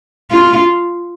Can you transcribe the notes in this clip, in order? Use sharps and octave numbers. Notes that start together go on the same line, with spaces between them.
F4